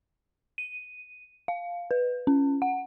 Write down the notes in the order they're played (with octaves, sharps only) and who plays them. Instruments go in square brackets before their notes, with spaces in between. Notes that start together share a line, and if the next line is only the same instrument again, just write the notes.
[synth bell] D#7
F5
B4
C#4
F#5